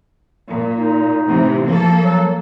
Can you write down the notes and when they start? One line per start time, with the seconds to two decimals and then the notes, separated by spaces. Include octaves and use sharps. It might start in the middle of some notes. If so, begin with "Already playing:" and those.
0.48 A#2
0.76 D#4
1.28 A2 C3 E3
1.65 F3 A#3 A4
2.01 F#3